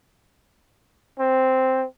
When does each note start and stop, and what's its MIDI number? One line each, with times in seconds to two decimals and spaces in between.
1.19 1.85 60